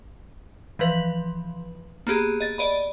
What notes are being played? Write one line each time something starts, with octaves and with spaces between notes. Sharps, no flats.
E3 F3 B4
A#3 B3 G4 G#4
D#5 A6
D5 D#5 B5